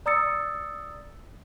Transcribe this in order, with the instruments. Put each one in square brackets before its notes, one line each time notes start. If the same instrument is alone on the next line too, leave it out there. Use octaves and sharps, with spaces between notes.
[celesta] D5 A#5 D#6 E6 A6 C#7